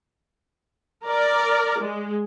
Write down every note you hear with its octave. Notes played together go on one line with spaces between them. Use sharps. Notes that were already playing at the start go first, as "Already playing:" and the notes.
A#4 D5
G#3